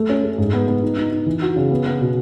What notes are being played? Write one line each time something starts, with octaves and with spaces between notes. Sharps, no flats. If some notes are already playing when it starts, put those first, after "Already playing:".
Already playing: A3
C#4
A3
G#2
B3
B3
D#4
D#4
D#4
E3
F#4
C#3
B3
B3
B2